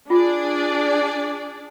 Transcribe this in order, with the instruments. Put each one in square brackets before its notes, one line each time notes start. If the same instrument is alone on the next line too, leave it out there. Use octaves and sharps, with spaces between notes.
[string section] D4 G#4 D5 [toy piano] F4